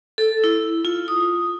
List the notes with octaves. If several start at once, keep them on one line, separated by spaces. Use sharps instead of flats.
A4
E4
F4
D#6